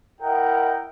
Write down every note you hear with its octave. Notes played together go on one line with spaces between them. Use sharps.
E4 A#4 D#5 F#5 G5